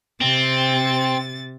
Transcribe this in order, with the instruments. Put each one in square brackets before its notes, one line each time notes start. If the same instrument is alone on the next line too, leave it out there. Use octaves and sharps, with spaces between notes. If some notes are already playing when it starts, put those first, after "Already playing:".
[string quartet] C3 A6 [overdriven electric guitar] C4